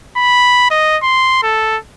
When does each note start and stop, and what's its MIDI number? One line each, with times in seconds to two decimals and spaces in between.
0.17 0.70 83
0.71 0.97 75
1.03 1.40 84
1.43 1.77 69